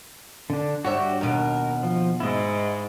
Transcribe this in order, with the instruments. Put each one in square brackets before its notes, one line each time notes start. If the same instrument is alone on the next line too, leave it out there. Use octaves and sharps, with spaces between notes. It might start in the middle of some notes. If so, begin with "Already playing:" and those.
[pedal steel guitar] D3 D4
[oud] G2 C#5 E5 [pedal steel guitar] F#4 G4
[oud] D#2 B2 [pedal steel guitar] A#4
[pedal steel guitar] F3
[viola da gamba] G#2 [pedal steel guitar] E4 D#5